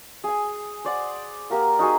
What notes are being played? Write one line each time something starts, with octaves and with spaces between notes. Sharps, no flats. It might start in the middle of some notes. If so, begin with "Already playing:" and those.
G#4 G#5
C5 D5 F#5
A#3 G4 A#4 F#5
D#4 F#4 G#4